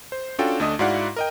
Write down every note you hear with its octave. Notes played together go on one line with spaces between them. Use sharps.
C5
C#4 D4 F4 F#4 A4 G5
D2 A3 D4 D#5 D#6
G#2 E4 F#4 D5 F5 F#5
A#4 D#5 G5